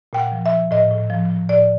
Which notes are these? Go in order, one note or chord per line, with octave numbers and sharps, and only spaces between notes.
A#2 G5
F#5
F3
E5
F3
A2 D#5
A2
F3
F3
A2 D5